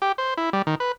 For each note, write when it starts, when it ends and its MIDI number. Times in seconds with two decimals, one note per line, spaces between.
0.02 0.12 67
0.18 0.34 72
0.37 0.50 64
0.53 0.62 55
0.67 0.75 51
0.80 0.92 71